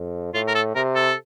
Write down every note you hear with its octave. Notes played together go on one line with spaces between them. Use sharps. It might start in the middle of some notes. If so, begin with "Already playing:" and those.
Already playing: F2
A2 F4
A#4
A4
C3 A#4
A4